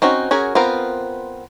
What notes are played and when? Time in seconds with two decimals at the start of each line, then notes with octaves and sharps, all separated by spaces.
0.02 C4 C#4 D#4 F#4
0.31 C#4 F#4 G#4 A#4
0.55 B3 C4 F4 A#4